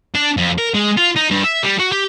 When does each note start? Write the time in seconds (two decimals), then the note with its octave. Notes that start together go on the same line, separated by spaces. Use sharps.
0.15 D4
0.37 F2
0.58 A#4
0.74 G#3
0.97 F4
1.16 D#4
1.30 G2
1.44 E5
1.63 G3
1.79 F#4
1.92 G4